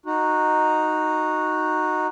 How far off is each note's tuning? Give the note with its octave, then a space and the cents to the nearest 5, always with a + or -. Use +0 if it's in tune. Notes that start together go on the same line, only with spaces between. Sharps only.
D#4 -5 F#4 -10